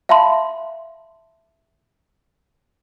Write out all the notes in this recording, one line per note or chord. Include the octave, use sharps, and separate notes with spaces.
E5 F5 A5 B5 C6